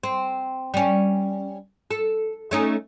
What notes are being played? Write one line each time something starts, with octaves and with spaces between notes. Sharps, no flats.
C4
G3 C#4
A4
A3 C#4 D#4